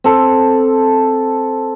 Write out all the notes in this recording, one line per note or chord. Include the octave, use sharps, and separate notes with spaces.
C4 A4